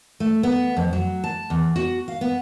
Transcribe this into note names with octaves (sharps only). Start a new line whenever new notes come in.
A3
B3
F2
F#3
A5
E2
F#4
F5
B3